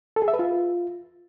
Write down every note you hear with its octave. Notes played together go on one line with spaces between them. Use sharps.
A4
G#4
E5
B4
F4